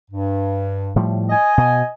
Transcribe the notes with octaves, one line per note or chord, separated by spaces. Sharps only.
G2
A2 F3 G3
D#5 G#5
B2